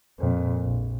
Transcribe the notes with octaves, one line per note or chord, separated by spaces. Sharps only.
F2 A#2
A#1